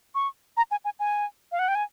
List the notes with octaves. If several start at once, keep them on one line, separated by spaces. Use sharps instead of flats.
C#6
A#5
G#5
G#5
G#5
F5
F#5
G5
G#5